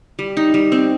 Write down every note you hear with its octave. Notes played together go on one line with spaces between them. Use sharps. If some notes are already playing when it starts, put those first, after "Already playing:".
G3
D#4
G3
C4